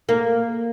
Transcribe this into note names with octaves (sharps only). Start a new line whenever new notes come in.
A#3